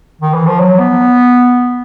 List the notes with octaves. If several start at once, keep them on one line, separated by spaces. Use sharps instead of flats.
D#3
E3
F3
F#3
B3